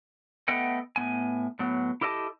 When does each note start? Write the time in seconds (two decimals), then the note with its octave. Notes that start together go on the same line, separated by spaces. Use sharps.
0.48 A3 B3 A4 D#5 F#5 G5
0.96 A2 B3 G#5
1.59 A2 F#3 B3
2.01 E4 G4 A4 D#5 G5 A5